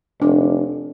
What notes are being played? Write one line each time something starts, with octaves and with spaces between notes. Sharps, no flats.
F1 D4